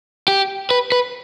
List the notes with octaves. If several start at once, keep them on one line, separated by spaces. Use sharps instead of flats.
G4
B4
B4